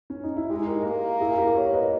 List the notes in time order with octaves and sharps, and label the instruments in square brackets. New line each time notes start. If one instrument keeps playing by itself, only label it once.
[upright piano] C#4
D#4
E4
[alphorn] G#3 [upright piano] D#4 G4
[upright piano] G4 A#4
[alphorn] A#3
[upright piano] E4 G#4
G4 A#4
A#4 C#5
B4 D#5